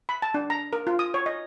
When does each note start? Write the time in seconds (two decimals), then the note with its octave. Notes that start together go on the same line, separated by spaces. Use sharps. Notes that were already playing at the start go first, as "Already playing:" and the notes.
0.09 B5
0.22 A5
0.34 D4
0.50 A#5
0.73 A#4
0.87 F4
0.99 D#6
1.14 C#5
1.26 D#5